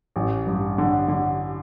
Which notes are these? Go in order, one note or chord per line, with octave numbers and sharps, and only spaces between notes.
A1
G2
D3
D3